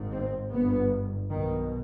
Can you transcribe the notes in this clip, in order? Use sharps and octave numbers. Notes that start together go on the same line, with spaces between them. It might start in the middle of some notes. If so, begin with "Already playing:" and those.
Already playing: G#1 G#2
C4
G1 G2 B3
B1 B2 D#3